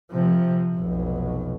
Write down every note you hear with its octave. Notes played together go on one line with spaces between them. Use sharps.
C3 F3
F1 B1